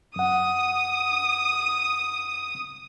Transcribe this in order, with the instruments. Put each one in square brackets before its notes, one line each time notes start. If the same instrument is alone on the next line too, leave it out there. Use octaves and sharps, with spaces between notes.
[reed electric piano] F#2 F#5 [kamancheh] D#6